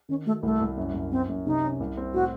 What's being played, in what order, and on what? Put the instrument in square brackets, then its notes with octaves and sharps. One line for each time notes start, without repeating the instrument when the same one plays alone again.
[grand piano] D#3 [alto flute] C#4
[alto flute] A3 [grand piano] F#4
[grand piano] C2 [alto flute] A3
[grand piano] C2
F#2
F#2
[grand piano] F#2 [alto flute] C4
[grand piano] F#2
[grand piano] C3 [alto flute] D#4
[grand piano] C#4
C2
C4
[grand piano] A2 [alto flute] F#4